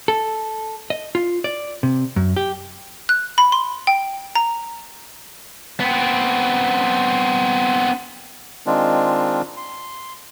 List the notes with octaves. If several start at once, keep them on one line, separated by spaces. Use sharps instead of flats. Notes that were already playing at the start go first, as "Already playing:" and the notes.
A4
D#5
F4
D5
C3
F#2
G4
F#6
B5
C6
G5
A#5
B3 C4
D#3 G#3 C4 D4 F4
C6